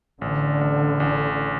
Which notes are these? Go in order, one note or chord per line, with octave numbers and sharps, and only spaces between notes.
A1 D3
A1
A1